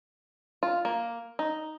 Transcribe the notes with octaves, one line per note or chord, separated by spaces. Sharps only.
F4
A#3
D#4